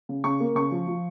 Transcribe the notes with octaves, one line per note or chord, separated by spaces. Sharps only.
C#3
C#3 C#6
A#3
C#3 C#6
F3
F3